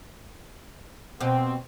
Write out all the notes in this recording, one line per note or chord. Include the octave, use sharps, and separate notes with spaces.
B2 C4 G4